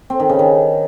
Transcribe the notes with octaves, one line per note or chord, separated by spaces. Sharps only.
C4
D#3
C#3
D#3